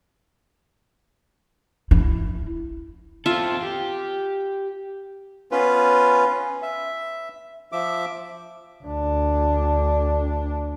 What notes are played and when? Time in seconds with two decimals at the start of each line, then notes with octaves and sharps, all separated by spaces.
1.91 E4
3.26 C4 F4 A4 E5
3.63 G4
5.52 B3 C#4 F4 B4
6.62 E5
7.72 F3 E5 D6
8.84 D2 D4